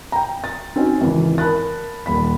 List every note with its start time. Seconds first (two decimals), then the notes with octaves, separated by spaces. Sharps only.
0.12 G5 A#5
0.44 A6
0.76 C4 C#4 D#4 F#4
1.01 G#1 C#3 E3
1.38 A#4 A5 B5 F#6 A6
2.06 D#1 B5 B6